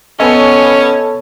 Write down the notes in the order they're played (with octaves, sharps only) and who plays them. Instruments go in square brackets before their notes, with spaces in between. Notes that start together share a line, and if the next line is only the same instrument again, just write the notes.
[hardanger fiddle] B3 [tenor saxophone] C#4 [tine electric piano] A4 C#5 A5 [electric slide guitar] D#5 G#5